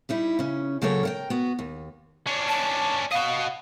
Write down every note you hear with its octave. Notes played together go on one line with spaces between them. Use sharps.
G3 D#4 E4
C#3 C#4
C#3 F#3 A#3 A4 A#4 C#5
A#4 F#5 G5
B3 F#4
D#2
C#4 D4
A5
F#4 D#5 F5